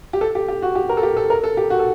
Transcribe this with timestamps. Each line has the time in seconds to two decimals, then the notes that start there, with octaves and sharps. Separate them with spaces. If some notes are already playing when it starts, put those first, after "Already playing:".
0.13 G4
0.21 A4
0.35 G4
0.48 G4
0.62 F#4
0.75 G4
0.89 A#4
0.97 A4
1.03 G4
1.17 A4
1.30 A#4
1.44 A4
1.57 G4
1.70 F#4
1.79 A4